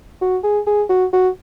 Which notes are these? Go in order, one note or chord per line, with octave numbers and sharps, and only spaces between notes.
F#4
G#4
G#4
F#4
F#4